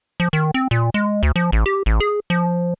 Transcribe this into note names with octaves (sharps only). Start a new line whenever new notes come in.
F3
D#3
C4
A#2
G#3
D2
F3
A1
G4
A1
G#4
F3